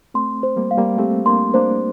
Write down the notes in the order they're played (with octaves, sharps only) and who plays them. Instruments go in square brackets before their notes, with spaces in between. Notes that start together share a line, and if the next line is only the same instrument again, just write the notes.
[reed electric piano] A3 C4 [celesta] C6
[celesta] C5
[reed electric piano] G3 A#3
[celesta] F5
[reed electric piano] G3 A#3
[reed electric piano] A3 C4 [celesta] G4
[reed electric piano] A#3 D4 [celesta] C6
[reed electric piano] A#3 D4 [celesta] C5